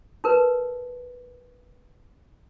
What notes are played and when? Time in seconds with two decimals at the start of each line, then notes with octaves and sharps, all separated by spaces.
0.24 D#4 A#4 B4